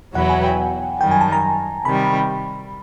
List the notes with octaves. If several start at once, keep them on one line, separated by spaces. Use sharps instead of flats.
E2 B2 F#3 B3 E4 F#5
G#5
G5
F#2 D#3 G3 G5
G#5
A5
A#5
C3 D#3 G3 B5